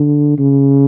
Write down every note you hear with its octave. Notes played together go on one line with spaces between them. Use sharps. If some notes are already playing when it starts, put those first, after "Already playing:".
Already playing: D3
C#3